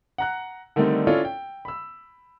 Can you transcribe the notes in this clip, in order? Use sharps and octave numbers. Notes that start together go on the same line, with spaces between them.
F#5 A#5 F#6
D3 D#3 G3 A3 C4 D#4
C#4 E4 F4 A4 C#5 D5
G5
B5 E6